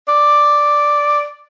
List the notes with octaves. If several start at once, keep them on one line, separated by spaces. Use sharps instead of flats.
D5